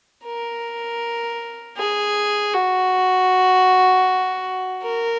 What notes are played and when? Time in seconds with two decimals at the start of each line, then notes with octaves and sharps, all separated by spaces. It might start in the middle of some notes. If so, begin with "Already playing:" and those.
0.25 A#4
1.77 G#4
2.53 F#4
4.82 A#4